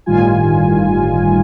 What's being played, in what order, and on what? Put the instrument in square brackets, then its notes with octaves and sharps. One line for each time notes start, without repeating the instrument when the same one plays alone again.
[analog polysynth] G1 A2 D#3 G3 F4 G#5